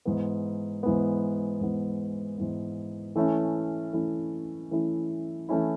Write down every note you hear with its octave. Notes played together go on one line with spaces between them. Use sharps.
G#2 E3 B3
G#2 E3 B3
G#2 E3 B3
G#2 E3 B3
E3 A3 C#4 E4
E3 A3 C#4 E4
E3 A3 C#4 E4
E3 A3 C#4 E4